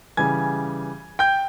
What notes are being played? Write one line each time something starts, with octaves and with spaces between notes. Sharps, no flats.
C#3 E3 G3 G#5 G#6
G5 G6